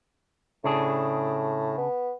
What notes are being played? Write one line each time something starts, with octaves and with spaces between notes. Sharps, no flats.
A2 C#3 D4 G#4
B3